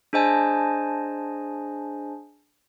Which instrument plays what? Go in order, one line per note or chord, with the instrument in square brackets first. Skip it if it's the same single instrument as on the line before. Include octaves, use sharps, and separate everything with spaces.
[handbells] D4 G#4 C5 D#5 G#5 A5